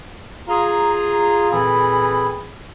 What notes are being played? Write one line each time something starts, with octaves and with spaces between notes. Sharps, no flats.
F4 G#4 A#5
A#2 E3 C4 G#4 A4 B5